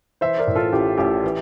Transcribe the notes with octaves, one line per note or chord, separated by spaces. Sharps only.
E3 C5 E5
A#4 D5
A2
F4 A4
A1 G4
A1 G4
E3